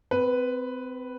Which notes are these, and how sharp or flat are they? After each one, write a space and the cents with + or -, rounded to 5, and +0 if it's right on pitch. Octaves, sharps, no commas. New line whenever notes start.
C4 -30 B4 +0